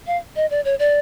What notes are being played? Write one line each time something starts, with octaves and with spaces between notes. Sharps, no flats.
F5
D#5
D5
C#5
D5